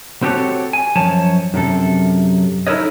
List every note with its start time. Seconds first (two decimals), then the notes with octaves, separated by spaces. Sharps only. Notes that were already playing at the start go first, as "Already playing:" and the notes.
0.22 C4 F#4 G4 A4 B4 C#5
0.73 G#5
0.96 F#2 F3 C#5 A5
1.54 F#2 C3 A4
2.67 D#4 E4 A4 A#4 C#5 D#5